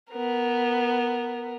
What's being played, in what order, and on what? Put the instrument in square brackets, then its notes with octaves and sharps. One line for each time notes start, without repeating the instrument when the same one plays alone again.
[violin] B3 A#4